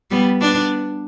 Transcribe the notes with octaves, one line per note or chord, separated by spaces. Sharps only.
G3 B3
B3 D4